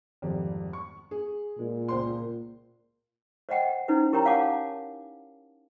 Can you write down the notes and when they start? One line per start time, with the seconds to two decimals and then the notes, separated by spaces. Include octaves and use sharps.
0.22 G#1 F2 G3
0.73 C#6
1.11 G#4
1.59 A#2 G#3
1.88 C#2 C5 C6
3.49 C5 D5 D#5 F#5 G5
3.88 C#4 D#4 E4 B4 C5
4.12 E4 G4 A#4 C#5 G5 A#5
4.25 C#5 F5 F#5 G#5 A5 D6